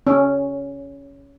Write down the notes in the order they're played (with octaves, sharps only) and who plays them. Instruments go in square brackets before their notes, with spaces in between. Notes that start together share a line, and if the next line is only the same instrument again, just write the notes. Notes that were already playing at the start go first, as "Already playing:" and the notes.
[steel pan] C#4